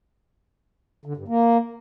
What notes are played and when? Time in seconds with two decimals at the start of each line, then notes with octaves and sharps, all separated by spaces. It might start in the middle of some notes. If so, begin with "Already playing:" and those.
1.06 D3
1.17 G2
1.28 A#3